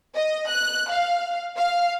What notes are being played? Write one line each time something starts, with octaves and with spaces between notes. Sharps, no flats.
D#5
F#6
F5
F5